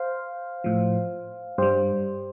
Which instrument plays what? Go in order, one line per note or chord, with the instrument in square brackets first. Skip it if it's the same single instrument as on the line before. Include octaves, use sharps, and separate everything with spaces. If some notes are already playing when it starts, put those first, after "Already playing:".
Already playing: [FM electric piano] C5 F5
A2 F3
G2 G3 G4 C5